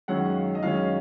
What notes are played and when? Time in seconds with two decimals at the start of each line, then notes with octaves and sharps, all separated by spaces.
0.08 F#2 D#3 G#3 C#4 F#5
0.36 F5
0.55 D#5
0.63 F#2 D#3 G#3 C#4 F5